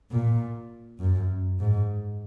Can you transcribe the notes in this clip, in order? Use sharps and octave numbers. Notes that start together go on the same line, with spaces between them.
A#2
F#2
G#2